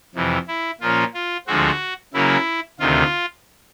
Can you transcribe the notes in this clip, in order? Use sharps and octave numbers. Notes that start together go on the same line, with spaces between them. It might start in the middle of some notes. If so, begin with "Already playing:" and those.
F2 C3 E3
E4
A#2 F3 A#3 C#4 F4
F4
D2 D3 F3 G#3 C4 F#4
C#3 F#3 A#3 C#4 E4
D2 C3 D#3 F4